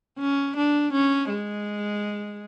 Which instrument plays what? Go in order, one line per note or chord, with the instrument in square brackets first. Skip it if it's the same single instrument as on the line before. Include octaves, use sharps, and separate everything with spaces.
[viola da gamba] C#4
D4
C#4
G#3